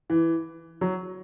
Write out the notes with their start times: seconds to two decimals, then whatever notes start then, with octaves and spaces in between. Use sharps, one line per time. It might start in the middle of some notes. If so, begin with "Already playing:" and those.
0.10 E3
0.81 F#3